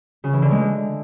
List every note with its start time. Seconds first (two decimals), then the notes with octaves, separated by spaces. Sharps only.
0.24 C#3
0.33 E3
0.42 D3
0.51 G#3
0.60 D3